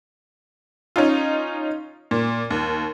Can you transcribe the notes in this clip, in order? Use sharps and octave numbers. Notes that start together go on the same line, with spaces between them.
C#4 D#4 F4
A#2
D#2